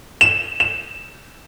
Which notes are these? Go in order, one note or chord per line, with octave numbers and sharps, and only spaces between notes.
E7
E7